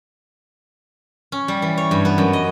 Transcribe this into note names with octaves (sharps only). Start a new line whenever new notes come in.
C#4
G3
E3
C#5
G2
B3
F#2
D#5